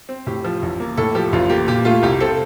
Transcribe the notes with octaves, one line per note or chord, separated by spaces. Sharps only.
C4
A2 G4
F3
A1
A#3
A2 A4
F3 G4
A1 F4
A#3 G4
A#2 G4
A3 F4
C2 G4
C4 A4